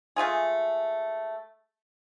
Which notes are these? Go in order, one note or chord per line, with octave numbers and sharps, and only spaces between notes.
G#3 A3 F4 G#4